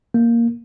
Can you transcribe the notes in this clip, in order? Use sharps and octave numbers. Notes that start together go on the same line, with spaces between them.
A#3